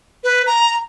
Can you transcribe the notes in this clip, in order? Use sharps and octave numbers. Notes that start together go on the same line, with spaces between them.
B4
A#5